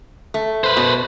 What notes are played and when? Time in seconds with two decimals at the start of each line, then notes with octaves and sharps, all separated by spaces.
0.34 A3
0.64 B4 C5
0.77 B2